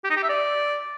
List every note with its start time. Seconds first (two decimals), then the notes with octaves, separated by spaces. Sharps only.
0.04 G4
0.10 D#4
0.17 G4
0.23 E5
0.29 D5